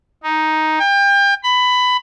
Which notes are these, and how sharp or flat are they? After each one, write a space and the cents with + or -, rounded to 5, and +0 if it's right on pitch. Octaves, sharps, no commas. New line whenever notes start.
D#4 +5
G5 +30
B5 +15